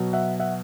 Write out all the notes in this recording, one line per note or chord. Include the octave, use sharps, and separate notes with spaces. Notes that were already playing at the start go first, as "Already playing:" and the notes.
Already playing: B2 F#3
E5 F#5
E5 F#5